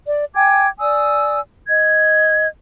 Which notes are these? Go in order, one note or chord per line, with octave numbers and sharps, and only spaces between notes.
D5
G5 G#5 D6 G#6
D5 G#5 D#6 E6
D#5 G#6